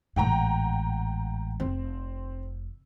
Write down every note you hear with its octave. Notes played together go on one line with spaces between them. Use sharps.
A1 G#2 F#5 G5 A#5
F1 C4